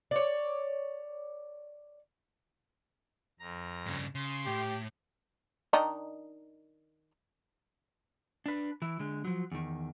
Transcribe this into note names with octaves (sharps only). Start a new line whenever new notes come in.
C#5 D5
F2 A#5
G2 C#3
C#3 C6
A2 G4
D#3 D4 D#4
D4 B4
E3 E4
D3 G#3
F3 F#3
E2 D#3